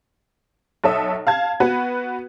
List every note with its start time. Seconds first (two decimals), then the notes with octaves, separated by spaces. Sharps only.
0.84 B1 A4 C#5 E5 D#6
1.27 F5 A5 G#6
1.60 B3 F#4 B4